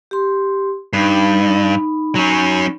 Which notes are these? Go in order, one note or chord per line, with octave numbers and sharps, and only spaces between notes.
G4 C6
G2 D#4 B5
F#3 C#4